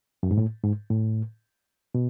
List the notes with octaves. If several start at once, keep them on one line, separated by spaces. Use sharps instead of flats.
F#2
G#2
A2
G#2
A2
B2